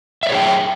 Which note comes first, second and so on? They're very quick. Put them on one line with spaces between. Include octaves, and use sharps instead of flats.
E5 D5 C#5 G#4 G5